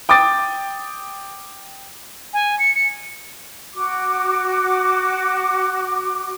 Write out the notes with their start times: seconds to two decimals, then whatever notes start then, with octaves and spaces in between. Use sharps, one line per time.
0.09 G5 D6 D#6 A6
2.34 G#5
2.59 C#7
2.75 C#7
3.72 F#4 D6